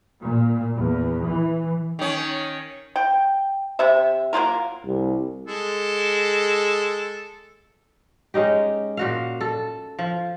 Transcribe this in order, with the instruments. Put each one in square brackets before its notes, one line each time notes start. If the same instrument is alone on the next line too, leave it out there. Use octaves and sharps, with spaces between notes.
[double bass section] A#2
E2
E3
[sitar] D#3 C#4
[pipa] G5
C3 E5
F#3 A#3 F4 A#4
[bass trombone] C2
[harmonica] G#3 A4
[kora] G#3 C#4 D#4 G4
A#2 F#4 F5
A4
F3